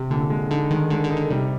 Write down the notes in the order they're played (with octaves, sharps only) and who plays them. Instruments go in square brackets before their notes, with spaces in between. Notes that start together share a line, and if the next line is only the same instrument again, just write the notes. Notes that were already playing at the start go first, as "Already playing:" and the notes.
Already playing: [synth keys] C3
[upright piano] A#2 [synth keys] D3
[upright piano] G#3
[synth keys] D3 [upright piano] D#4
[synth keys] D#3 [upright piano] G#3
[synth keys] D3 [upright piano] G#3
[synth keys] D3
[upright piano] D#4
[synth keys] D3
[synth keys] C3 [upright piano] G3